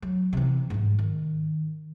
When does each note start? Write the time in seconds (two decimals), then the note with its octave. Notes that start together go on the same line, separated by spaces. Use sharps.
0.02 F#3
0.33 C3 E3
0.70 G#2 F3
0.99 D#3